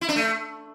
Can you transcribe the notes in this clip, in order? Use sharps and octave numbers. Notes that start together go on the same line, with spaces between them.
E4
D4
A3